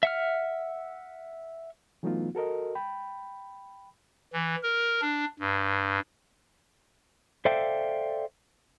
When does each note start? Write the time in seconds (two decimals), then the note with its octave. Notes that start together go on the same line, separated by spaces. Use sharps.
0.03 E5 F#5 F6
2.03 E3 F#3 A3 B3 D#4 F4
2.35 F#4 A4 A#4 D#5
2.75 G5 B5
4.33 E3
4.63 A#4
5.01 D4
5.40 G2
7.45 A4 C5 D5 E5 F5 G5